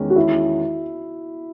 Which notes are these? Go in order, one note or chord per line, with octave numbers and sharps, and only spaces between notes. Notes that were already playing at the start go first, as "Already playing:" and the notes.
Already playing: E2 D#3 G#3 C#4
F#4
E4